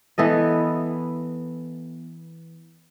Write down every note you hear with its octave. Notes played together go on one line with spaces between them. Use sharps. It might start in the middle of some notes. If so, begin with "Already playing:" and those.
E3 B3 A4 D#5